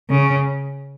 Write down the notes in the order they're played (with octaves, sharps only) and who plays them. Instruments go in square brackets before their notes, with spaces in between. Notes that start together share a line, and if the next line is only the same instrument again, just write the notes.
[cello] C#3